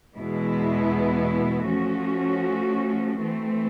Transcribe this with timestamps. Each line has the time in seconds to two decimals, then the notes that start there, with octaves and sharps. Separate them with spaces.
0.15 E2 B2 G#3 B3 E4
1.68 F3 A3 C#4 F#4
3.21 E3 A3 C4